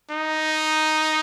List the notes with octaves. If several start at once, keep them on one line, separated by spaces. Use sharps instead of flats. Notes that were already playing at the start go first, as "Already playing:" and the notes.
D#4